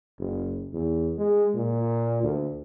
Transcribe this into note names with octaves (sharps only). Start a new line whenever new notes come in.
F#1
E2
G#3
A#2
D2